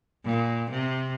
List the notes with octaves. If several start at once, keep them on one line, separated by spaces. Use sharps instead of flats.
A#2
C3